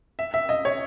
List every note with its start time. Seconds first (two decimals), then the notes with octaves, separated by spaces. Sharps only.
0.19 E5
0.34 E5
0.49 D#5
0.65 C#5